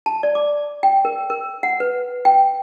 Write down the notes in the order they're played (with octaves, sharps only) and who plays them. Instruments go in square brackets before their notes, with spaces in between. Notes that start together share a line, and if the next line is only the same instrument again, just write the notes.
[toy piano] A5
D5
D6
G5
A#4
A#4
F#5
B4
G5